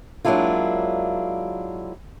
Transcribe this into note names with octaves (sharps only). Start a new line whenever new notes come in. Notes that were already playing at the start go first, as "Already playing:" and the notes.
F#3 G#3 A#3 D4 E4 F4